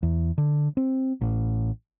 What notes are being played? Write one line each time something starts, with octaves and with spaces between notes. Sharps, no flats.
E2
D3
C4
A1